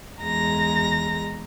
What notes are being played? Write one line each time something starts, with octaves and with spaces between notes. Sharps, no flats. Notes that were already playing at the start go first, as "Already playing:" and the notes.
E2 G#3 A#5 A#6